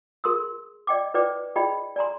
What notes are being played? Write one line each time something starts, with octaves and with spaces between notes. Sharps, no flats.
G#4 A#4 C6 D#6 E6
D5 D#5 G5 D6
E4 B4 C5 D5 G5 D6
E4 G#4 D5 D#5 G5 B5
D5 G#5 A#5 C6